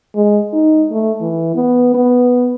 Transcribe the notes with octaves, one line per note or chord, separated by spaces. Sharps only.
G#3
D#4
A3
E3
B3
B3